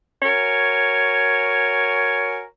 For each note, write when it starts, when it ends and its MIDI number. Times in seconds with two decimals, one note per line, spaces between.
0.23 2.44 66
0.23 2.44 70
0.23 2.44 73
0.23 2.44 80